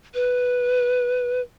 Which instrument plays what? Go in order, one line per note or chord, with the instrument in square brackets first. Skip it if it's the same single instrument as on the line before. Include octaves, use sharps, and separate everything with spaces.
[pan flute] B4